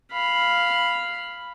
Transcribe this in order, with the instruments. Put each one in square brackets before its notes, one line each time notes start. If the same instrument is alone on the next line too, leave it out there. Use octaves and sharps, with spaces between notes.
[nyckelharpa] F5 B5